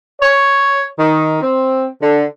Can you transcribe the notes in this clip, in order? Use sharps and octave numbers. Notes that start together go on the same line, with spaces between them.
C#5
D#3
C4
D3